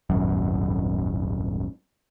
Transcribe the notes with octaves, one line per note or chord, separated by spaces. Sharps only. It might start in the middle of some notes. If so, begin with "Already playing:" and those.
D#1 G#1 F#2